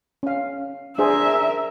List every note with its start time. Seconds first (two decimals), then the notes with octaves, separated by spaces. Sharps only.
0.23 C#4 F5
0.98 D4 G#4 A#4 C5 E5